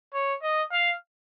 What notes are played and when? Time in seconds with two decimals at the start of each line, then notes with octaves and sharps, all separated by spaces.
0.14 C#5
0.42 D#5
0.72 F5